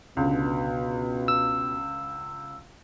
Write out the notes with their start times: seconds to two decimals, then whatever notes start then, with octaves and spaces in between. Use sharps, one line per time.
0.17 C#2 B2 D3
1.28 E6